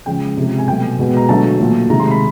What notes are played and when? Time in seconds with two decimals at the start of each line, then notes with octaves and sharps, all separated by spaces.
0.06 C#3 F3 G#3 G5
0.37 C3 F3 G#3
0.58 G#5
0.68 B2 F#3 A3 G5
0.99 B2 G#3
1.17 A#5
1.29 D3 F#3 A3 A5
1.59 A#2 F#3 A3
1.90 C3 D#3 G#3 A#5
2.00 C6
2.11 B5